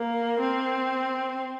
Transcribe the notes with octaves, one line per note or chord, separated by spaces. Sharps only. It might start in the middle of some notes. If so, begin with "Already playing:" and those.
Already playing: A#3
C4